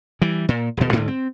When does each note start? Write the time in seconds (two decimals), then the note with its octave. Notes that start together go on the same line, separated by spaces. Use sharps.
0.22 E3 G3
0.49 A#2
0.77 D#1 B2
0.92 D2 G#2 D3 A#3
1.08 C4